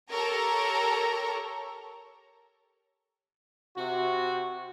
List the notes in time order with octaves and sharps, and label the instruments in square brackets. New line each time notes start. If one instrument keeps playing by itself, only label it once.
[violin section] G4 A4 A#4 C#5 A#5 C#6
[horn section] C3 F#4